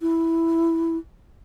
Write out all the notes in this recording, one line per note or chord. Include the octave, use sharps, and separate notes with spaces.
E4